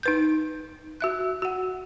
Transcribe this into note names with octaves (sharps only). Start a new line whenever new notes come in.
D#4 B4 G6
F#4 E5 F#6
F#4 F#5